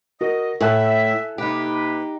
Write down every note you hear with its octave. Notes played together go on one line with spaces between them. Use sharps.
F#4 A#4 D#5
A2 A4 E5 G#5 F#6
C3 A#3 D#4 G4 B4